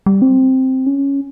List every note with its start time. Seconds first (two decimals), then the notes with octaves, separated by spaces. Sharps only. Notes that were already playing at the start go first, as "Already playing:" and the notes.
0.06 G3
0.22 C4
0.87 C#4